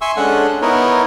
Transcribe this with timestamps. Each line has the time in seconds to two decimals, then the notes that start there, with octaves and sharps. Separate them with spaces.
0.01 E5 G#5 C6 C#6 E6
0.17 G#3 C#4 D4 A4 F#5
0.62 B3 D#4 E4 A#4 C#5